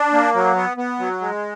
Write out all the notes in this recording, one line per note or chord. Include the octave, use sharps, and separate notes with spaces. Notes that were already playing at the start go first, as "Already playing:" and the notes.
Already playing: D4
A#3
F#3
B3
B3
F#3
G#3